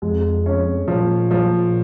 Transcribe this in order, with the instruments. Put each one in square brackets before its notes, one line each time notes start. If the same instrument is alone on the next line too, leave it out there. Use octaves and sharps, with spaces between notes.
[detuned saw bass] F2 [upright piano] G#3
[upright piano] C#4
[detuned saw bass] A#2 [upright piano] F3
[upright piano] F3